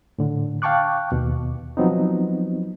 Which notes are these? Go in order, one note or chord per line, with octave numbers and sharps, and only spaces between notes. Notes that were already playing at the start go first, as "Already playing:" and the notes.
A2 D3
F5 G5 A5 C#6 D6 F#6
D#2 B2
F3 F#3 B3 C4 D#4